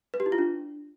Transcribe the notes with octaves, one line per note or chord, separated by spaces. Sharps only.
B4
G4
E4
F4
D4